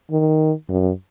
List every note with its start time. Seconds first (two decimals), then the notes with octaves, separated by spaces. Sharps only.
0.11 D#3
0.69 F#2